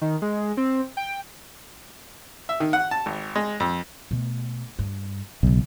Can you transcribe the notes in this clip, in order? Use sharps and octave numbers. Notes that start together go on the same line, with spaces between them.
D#3
G#3
C4
G5
E5
D#3
F#5
A5
G#1
G#3
F2
B2 A3
G2
B1 C#3 E3